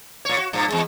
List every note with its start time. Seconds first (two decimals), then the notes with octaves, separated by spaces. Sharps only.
0.25 A#2 C#5
0.38 F#4
0.53 G2 A#2
0.68 E2 G#3